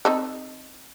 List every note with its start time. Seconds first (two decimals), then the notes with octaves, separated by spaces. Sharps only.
0.05 C4 D#4 A4